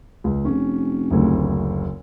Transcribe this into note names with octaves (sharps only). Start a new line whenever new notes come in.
C#2
F1 C#4
F#1 D2